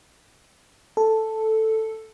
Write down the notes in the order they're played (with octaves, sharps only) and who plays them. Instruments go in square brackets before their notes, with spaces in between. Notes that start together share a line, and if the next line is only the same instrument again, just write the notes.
[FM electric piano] A4